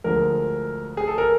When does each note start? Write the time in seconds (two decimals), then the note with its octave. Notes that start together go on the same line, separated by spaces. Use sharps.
0.04 D2 D3 F3 G#3 A#4
0.97 G#4
1.08 A4
1.18 A#4